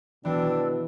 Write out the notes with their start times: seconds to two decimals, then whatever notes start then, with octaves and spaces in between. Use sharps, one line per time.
0.25 B2 E3 D4 G5 A5 E6